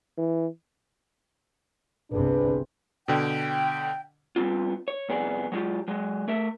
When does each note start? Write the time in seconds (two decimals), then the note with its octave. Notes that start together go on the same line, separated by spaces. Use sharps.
0.18 E3
2.12 G1 C2 C3 D4 G#4 B4
3.08 B2 D3 G5
4.36 G3 B3 C4 F4
4.88 C#5
5.09 C2 F2 B3 G#4 D5
5.52 F#3 G#3 F4 G4
5.88 F#3 G#3
6.28 A3 A#4 E5